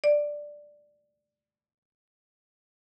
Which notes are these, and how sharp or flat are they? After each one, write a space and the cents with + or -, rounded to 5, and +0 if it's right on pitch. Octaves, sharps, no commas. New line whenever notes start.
D5 +5